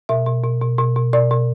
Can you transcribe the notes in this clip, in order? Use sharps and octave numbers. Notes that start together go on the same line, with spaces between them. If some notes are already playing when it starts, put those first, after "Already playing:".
B2 E5
B2
B2
B2
B2
B2
B2 D5
B2